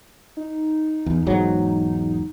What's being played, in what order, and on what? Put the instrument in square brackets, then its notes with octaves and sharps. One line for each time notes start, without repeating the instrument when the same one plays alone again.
[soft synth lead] D#4
[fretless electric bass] E2
E1 G#2 F#3